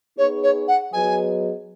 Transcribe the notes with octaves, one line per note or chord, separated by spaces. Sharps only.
B3 D#4 G#4 C#5
C#5
F#5
F#3 B3 G#4 B4 D#5 G#5